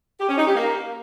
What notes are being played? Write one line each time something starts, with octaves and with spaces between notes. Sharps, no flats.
G4
C#4
D#4
G4
A#3